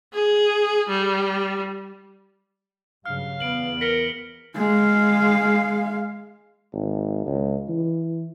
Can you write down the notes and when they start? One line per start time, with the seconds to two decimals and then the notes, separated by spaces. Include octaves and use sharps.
0.14 G#4
0.89 G3
3.06 G2 C#3 F#3 F5 F6
3.40 E2 B3 D7 F#7
3.81 A#4 B6 C#7 G7
4.56 G#3 F5
6.73 G#1
7.26 C#2
7.68 E3